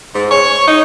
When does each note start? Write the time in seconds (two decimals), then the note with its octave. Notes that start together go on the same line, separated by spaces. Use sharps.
0.15 G#2
0.31 C#5
0.67 D#4